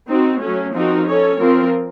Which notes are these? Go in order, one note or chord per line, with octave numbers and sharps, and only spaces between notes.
C4 D#4 F#4
F#3 A3 C#4
F3 C4 D#4 F#4 A#4
C#4 A4 C#5
F3 C4 F4 A#4